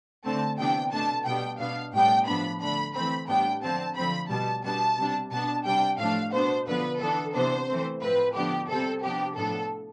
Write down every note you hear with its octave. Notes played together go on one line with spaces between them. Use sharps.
D3 A3 C4 A5
C3 E3 B3 D4 G5
B2 A3 D4 A5
B2 G3 B3 D4 G5
B2 B3 D4 F5
A2 G3 B3 D4 G5
A2 F3 B3 D4 B5
D3 A3 D4 B5
E3 A3 C4 B5
A2 G3 B3 D4 G5
D3 F3 C4 A5
D3 F3 A3 C4 B5
B2 G3 B3 A5
B2 G3 B3 D4 A5
C3 G3 D4
B2 B3 D4 A5
C3 G3 D4 G5
A2 F3 A3 D4 F5
B2 B3 D4 C5
D3 F3 B3 B4
E3 B3 D4 A4
C3 E3 B3 D4 C5
E3 A3 C4
A2 F3 C4 B4
D3 F3 B3 D4 G4
C3 G3 C4 A4
C3 F3 B3 D4 G4
A2 F3 B3 D4 A4